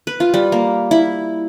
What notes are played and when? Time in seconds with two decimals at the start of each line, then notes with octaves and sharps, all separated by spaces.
0.07 B4
0.20 F4
0.34 G3
0.52 A#3
0.91 E4